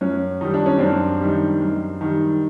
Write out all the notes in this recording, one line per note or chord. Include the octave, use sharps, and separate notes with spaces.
F#2 C#4
D#3 G3 D#4
D4
C#4
F#2 C4 D4
D#3 G3
F#2
D#3 G3